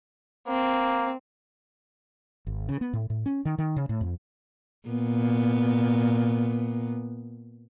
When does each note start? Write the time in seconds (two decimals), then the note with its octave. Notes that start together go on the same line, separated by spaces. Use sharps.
0.48 A#3 C4
2.47 G#1
2.69 C#3
2.81 B3
2.93 A2
3.10 A2
3.26 C#4
3.45 D#3
3.58 D#3
3.76 C#3
3.89 A2
4.01 F2
4.88 A#2 B3